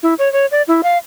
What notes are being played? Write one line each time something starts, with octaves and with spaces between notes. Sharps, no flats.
E4
C#5
C#5
D5
E4
F5